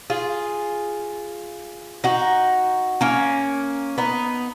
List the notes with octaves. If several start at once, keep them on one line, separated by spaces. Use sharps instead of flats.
F4 G#4
D#4 F#4
A#3 C#4
B3 D#4